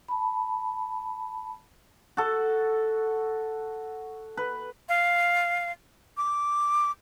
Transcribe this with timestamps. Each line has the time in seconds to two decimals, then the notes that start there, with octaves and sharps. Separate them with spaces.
0.08 A5 B5
2.17 F#4 A4
4.37 B4
4.89 F5
6.17 D6